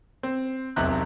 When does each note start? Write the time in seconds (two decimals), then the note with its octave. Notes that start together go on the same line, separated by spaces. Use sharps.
0.23 C4
0.76 E1 B1 C3 F#6